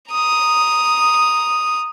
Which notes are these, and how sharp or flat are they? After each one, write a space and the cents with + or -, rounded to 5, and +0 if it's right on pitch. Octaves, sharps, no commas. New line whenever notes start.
A#5 +0 D#6 +0